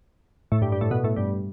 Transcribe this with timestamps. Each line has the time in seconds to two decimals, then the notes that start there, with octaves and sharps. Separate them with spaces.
0.52 A2 A3
0.61 G2 G3
0.72 G2 G3
0.81 A2 A3
0.91 B2 B3
1.04 A2 A3
1.16 G2 G3